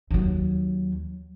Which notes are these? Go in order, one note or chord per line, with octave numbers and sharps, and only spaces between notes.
D#2 F#3